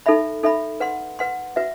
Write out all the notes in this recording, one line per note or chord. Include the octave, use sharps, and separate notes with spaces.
D#4 A4 E5 B5
D#4 A4 E5 B5
B4 F#5 C6
B4 F#5 C6
F#4 B4 E5